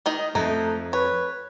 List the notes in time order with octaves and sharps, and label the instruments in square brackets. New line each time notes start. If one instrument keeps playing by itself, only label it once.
[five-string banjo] D#3 D#4 D#5
[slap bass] F2 [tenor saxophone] A3 [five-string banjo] D#4
[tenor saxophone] B4 [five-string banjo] C#5